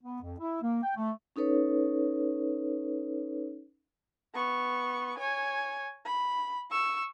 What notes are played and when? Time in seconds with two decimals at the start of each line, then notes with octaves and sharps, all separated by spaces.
0.03 B3
0.21 F2
0.39 E4
0.62 A#3
0.83 G5
0.96 A3
1.36 C#4 D#4 A4 B4 C#5
4.34 B3 C#6
5.18 C#5 G#5
6.05 B5
6.70 C#6 E6